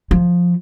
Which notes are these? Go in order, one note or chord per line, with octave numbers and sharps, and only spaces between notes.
F3